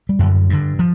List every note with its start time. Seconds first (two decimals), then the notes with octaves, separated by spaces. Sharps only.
0.09 G3
0.19 F#2 D3
0.50 G2 D3
0.79 F3